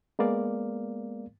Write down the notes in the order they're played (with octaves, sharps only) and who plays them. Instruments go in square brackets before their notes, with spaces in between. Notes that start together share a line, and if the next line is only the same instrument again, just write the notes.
[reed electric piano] G#3 A#3 B3 A#4 D5 F5